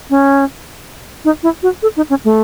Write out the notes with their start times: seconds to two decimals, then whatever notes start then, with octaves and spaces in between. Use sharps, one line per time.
0.10 C#4
1.25 D#4
1.43 E4
1.63 F#4
1.82 A4
1.97 D#4
2.10 C#4
2.24 A3